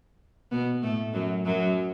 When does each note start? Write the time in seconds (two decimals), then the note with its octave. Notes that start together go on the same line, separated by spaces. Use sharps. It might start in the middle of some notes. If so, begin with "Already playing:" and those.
0.51 B2 B3
0.82 A2 A3
1.13 F#2 F#3
1.45 F#2 F#3